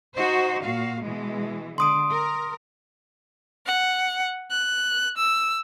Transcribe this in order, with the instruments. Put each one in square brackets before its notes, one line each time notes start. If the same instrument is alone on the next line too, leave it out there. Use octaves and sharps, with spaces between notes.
[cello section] D#4 F#4 C5
A#2 F#4 F5
B2 E3 G#3
[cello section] D3 [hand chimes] C6 D#6 D7
[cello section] A#4
[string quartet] F#5
F#6
E6